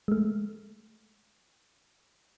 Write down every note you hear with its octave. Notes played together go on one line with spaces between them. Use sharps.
G#3 A3